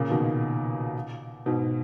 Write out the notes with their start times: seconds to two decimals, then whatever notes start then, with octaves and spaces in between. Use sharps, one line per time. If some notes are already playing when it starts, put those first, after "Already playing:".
Already playing: A#2 C#3
0.10 B2 D#3
1.46 G#2 B2